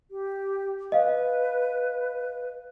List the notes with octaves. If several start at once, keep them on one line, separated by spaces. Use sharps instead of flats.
G4
B4 D#5 F5